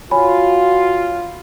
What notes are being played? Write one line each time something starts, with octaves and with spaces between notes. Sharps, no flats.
F4 F#4 C#5 G#5 B5